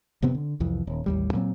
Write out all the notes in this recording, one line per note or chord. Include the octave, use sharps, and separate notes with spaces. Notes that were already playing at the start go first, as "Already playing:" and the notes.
F1 C3 B3 C4
D3
C2 F2 E3
D#1
A1 D#2 G3
A#2 F#3 C4